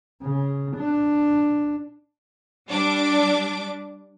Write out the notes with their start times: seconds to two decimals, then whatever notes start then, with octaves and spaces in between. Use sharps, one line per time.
0.22 C#3
0.77 D4
2.68 G3 D4 D6